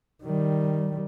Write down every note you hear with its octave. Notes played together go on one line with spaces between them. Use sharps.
D#3 G3